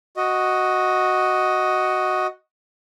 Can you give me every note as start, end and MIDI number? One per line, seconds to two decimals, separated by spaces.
0.17 2.27 66
0.17 2.27 75